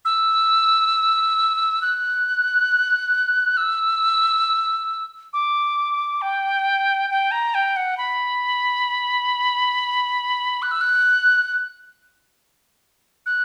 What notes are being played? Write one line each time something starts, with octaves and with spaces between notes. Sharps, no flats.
E6
F#6
E6
D6
G5
G5
A#5
G5
F#5
B5
F#6
E6
F#6
F#6